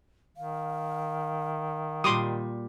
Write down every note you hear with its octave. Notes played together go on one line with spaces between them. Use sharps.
D#3 F5
A#2 G3 C6 D6 D#6